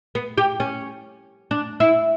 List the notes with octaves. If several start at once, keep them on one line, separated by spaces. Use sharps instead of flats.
B3
G4
C#4
D4
E4